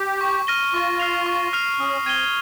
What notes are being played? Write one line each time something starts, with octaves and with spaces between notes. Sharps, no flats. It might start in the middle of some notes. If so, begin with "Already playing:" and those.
Already playing: G4
C#6
F6 A#6 D#7 G7
F4 C#6
F6 C7 F7
C#6
F6 C7 F7
C#4 D#6
C4 G#6 D#7 G7